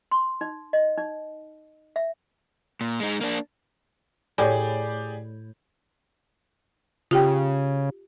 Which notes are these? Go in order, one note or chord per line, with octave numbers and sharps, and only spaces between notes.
C6
D#4
D#5
D#4
E5
A#2
G#3 D#4
A#3 D4
A2 G4 G#4 D5
C#3 F4 G4 G5